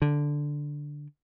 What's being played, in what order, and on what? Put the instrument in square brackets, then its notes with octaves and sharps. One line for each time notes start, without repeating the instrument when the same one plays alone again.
[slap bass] D3